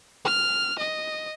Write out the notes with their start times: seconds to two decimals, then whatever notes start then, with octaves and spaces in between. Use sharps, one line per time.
0.25 F6
0.78 D#5